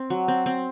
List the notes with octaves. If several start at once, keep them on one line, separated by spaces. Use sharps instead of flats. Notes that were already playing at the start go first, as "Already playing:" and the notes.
Already playing: C4
F#3
C4
C4